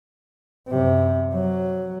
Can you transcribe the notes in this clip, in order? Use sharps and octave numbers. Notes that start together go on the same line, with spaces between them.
F#2 C3
F#3